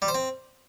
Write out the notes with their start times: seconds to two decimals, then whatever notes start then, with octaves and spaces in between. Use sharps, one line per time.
0.02 G3
0.08 C5
0.15 C4